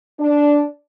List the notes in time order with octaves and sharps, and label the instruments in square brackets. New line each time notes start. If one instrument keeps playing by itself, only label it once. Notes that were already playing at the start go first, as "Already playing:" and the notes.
[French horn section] D4